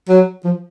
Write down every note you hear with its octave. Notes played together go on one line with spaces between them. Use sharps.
F#3
F3